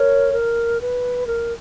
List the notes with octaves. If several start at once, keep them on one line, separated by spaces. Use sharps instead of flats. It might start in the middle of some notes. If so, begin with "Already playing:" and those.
Already playing: A#4 C#5
A#4
B4
A#4